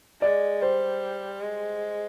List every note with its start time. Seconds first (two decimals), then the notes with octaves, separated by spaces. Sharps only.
0.21 G#3 D5
0.62 G3 C5
1.41 G#3